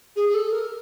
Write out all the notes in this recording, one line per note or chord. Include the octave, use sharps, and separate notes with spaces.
G#4
G#4
A4
A#4